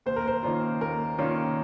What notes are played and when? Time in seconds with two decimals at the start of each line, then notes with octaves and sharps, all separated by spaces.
0.06 D#2 C5
0.16 A#4
0.28 C5
0.43 D#3 A#3 C#4 F4
0.81 D#2 A#4
1.18 D#3 A#3 C#4 F4